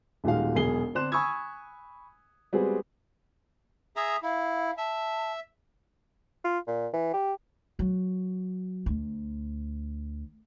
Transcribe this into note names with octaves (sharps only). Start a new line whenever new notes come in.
D#1 A#2 D#3 G#3 F#4 F5
E1 B1 G#4 C7 G7
D3 C4 D4 C6 F#6 E7
G#5 B5 C#6 D#6 E6 G#6
G3 G#3 B3 C4 F#4 G#4
G#4 E5 A#5 D#6
E4 F5
E5 A5
F4
A#2
E3
G4
F#3
D2